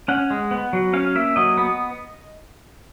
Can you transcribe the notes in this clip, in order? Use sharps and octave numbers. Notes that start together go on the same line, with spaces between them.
C#4 F#5
G#3
B3
F#3
C#4 F5
A#3 E5
F#3 D#5
B3